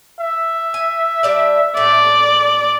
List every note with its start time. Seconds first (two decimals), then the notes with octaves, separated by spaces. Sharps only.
0.20 E5
0.74 G#5
1.23 G3 D4 D5
1.77 A2 D5